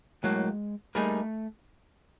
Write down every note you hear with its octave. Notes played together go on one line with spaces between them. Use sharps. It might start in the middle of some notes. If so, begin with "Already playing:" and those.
B1 A2 F#3 G#3 A#3
G3 A3 A#3 D#4 G#4